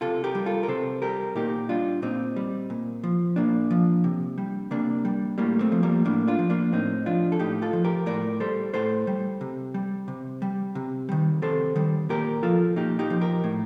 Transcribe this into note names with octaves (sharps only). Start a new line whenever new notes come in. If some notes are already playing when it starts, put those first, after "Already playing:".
C3 F4 A4
G4 A#4
G3
F4 A4
A#4
C3 A4 C5
G3 G4 A#4
A#2 D#4 G4
G3 D4 F4
A#2 C4 D#4
G3
A#2
F3
A#2 A#3 D4
F3
C3
G3
C3 A#3 D4
G3
A2 G3 A#3
A3 C4
F3
G3 A#3
A2 A#3 D4
D4 F4
F3
A#3 D4
A2 C4 D#4
F3 D4 F4
A4
A2 D#4 G4
F4 A4
F3
G4 A#4
A2 A#4 D5
G3 A4 C5
A2 A4 C5
G3
C3
G3
C3
G3
C3
D#3 G3
C3 A4 C5
D#3 G3
A#2 G4 A#4
F3 F4 A4
A#2 D#4 G4
D#4 G4
F3
G4 A#4
A2